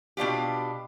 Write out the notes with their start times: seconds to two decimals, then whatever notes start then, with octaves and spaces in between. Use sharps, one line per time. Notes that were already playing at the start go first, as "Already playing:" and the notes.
0.17 B2 D4 F4 G4